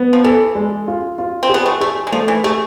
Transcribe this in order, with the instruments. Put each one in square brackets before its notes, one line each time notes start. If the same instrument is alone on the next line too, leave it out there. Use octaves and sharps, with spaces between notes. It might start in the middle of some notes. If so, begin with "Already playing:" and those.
Already playing: [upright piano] B3
[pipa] F3
[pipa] E3 [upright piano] A4
[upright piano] G#3
F4
F4
[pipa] C4
[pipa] B3 [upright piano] G#4
[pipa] A3
[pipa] A3 [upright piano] G#4
[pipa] G#3
[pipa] F3 [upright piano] A3
[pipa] E3
[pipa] A3 [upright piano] G#4